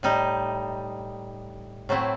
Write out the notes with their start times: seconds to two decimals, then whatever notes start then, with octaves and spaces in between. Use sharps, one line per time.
0.03 A2 G3 D#4
1.89 A2 F#3 A3 C4 E4